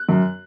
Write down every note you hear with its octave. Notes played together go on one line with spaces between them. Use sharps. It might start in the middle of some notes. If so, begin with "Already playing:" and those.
Already playing: F#6
F#2